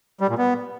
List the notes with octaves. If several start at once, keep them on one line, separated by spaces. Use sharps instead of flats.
G3
A#2
B3